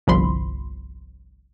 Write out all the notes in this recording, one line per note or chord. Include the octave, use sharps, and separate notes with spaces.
G1 C2 F3 B5 C6